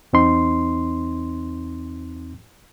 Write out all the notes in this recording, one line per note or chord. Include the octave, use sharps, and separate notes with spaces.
E2 C4 D#4 C6